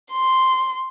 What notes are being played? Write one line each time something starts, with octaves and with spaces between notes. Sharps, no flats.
C6